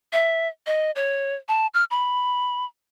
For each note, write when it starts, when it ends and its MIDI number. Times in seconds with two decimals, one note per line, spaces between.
0.13 0.48 76
0.66 0.91 75
0.96 1.35 73
1.48 1.67 81
1.74 1.84 89
1.91 2.65 83